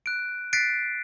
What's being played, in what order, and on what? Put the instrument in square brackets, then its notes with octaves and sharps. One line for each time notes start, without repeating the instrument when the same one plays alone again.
[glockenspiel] F#6 D7
F#6 A6 B6 C7 D7